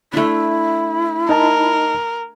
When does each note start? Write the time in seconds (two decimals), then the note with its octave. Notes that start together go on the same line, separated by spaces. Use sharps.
0.13 A3 D4 E4
1.29 D#4 A#4 D#5 A5